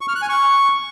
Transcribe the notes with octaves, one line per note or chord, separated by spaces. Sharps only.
C#6
F6
F#6
G#5
C#6